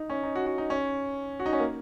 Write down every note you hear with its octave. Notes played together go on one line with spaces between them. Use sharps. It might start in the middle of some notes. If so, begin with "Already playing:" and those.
Already playing: D#4
C#4
D#4
F#4
F#4
D#4
C#4
F#4
D#4
C#4
A#3